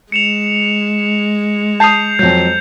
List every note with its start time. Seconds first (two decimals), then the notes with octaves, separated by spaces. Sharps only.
0.12 G#3 C#7 E7 F7
1.80 A5 D#6 G6 C7 F7
2.19 F2 F#3 G6